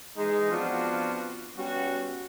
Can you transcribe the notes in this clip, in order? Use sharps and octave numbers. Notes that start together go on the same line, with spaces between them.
E3 G#3 D#4
F3 B3 C4 D4 F4 F#4
G3 B3 C#4 F#4